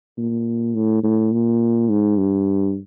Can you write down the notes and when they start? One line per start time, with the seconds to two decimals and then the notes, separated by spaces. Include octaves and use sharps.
0.17 A#2
0.74 A2
1.03 A2
1.32 A#2
1.90 G#2
2.17 G2